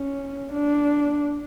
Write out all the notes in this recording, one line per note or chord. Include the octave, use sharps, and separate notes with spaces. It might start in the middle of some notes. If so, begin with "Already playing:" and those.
Already playing: C#4
D4